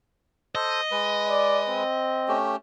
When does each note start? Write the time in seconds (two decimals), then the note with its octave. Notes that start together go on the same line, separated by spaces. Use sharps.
0.55 A4 C5 D#5
0.91 G#3 B4
1.30 D5
1.69 C4
2.28 A3 C#4 G4